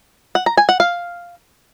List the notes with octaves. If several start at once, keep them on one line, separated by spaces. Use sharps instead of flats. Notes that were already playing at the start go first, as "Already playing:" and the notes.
F#5
A#5
G#5
F#5
F5